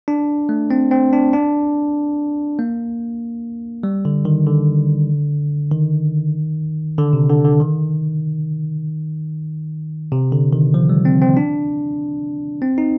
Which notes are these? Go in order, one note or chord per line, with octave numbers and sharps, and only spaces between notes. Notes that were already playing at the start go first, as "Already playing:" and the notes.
D4
A3
C4
C4
D4
D4
A#3
G3
D3
D#3
D3
D#3
D3
C3
D3
D3
D#3
C3
D3
D#3
F3
G3
C4
C4
D4
C4
D#4